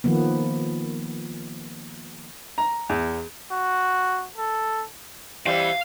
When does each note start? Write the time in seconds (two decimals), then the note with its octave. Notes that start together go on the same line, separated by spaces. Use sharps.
0.04 D#3 F3 A#3 B3
2.58 A#5
2.89 E2
3.52 F#4
4.38 A4
5.46 E3 G3 C4 F5